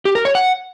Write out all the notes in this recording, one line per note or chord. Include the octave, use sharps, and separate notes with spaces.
G4
A#4
C#5
F#5